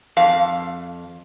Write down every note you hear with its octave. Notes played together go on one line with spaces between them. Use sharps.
F2 F5